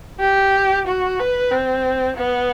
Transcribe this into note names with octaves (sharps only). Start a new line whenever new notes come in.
G4
F#4
B4
C4
B3